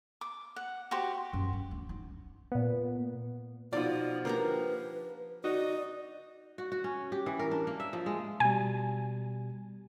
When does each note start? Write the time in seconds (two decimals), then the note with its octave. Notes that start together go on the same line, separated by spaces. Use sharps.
0.21 D6
0.56 F#5
0.91 F#4 G4 C5
1.33 F#2
1.53 G2
1.71 D2
1.89 D#4
2.52 A#2 B3
3.73 B2 F3 D#4 F4 D5
4.25 A#3 D4 G4 B4 A#5
5.44 D#4 F#4 D5
6.58 F#4
6.72 F#4
6.84 C#4
7.12 G4
7.26 E3
7.39 A#4
7.51 D4
7.67 A#3
7.80 E5
7.93 F3
8.06 G#3
8.40 B2 G3 G#5